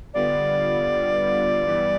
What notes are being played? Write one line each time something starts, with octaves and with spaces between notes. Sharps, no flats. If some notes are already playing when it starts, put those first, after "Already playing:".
D3 G3 B3 F4 D5
G2 E3 G3 B3